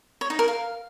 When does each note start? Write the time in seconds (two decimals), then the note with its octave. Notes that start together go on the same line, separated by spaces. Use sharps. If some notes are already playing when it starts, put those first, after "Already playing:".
0.21 C#5
0.30 D#4
0.39 A#4
0.48 F5